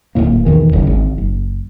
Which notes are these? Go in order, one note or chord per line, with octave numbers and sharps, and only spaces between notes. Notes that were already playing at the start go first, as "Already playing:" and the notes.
D1 F#2 A2 A#3
B1 E2 D#3 E3
F#1 D#2 C#3
G#1
F#1